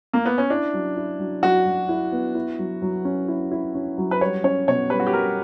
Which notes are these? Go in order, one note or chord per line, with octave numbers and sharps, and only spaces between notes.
A#3
B3
C#4
D4 E4
F#3
E4
F#3
F#3 F#4
F#3
E4
B3
E4
F#3
F#3
C#4
E4
E4
C#4
F#3
B4
G3 C#5
C#4 C#5
B2 C#5
G3 B4
F#4
G4
G3 A#4